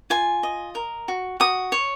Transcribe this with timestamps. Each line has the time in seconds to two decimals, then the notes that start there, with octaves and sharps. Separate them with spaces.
0.10 F4 G#5
0.43 D#5
0.75 A#4
1.08 F#4
1.40 F#4 D#6
1.72 C#5